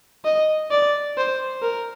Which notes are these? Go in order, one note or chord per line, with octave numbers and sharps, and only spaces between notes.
D#5
D5
C5
A#4